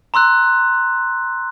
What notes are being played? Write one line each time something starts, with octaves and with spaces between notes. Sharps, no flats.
A#5 C6 E6 F#6